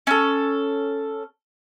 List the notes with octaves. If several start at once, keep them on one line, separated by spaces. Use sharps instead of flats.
C#4 A4